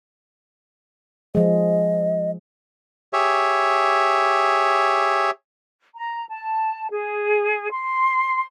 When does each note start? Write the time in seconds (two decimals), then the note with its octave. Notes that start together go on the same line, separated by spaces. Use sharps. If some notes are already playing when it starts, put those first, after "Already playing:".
1.35 F3 G#3 D#5
3.13 G4 G#4 C#5 E5
5.95 A#5
6.29 A5
6.91 G#4
7.71 C6